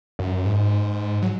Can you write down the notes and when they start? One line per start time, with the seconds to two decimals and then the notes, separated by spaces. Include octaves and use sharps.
0.19 F#2
0.46 G#2
1.22 F#3